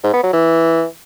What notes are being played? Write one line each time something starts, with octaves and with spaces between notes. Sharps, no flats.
G#2
B3
F#3
E3